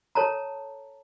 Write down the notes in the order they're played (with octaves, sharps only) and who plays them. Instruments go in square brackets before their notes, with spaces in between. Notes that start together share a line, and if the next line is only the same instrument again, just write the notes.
[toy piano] A4 C#5 A5 A#5